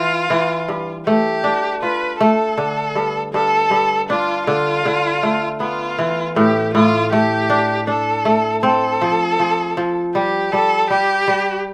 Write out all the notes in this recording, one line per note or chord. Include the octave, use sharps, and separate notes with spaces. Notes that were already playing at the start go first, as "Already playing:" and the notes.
Already playing: E3 F4
E3
G2
A3 G4
D4
F4 B4
A3 A4
D3
G2
G2 A4
G2
D4 F4
D3 F4
D3
A3
B3 F4
E3
A2 G4
A2 F4
A3 G4
D4
D4 A4
A3
C4 A4
F3
F3
F3
G3 G4
G3 A4
G3 G4
G3